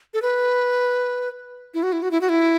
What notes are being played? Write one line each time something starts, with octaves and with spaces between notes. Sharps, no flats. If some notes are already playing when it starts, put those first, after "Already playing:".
A4
B4
E4
F#4
E4
F#4
E4
F#4
E4